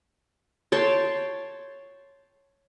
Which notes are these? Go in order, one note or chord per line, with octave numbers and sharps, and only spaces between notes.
C#5 G5 A5 C6